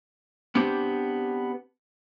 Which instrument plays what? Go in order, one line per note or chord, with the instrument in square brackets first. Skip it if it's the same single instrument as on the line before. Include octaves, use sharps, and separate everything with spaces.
[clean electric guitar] B3 C4 D4 G4 C5